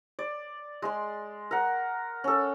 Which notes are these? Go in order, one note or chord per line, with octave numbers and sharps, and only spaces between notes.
D5
G#3 C6
A#4 F#5
C#4 A4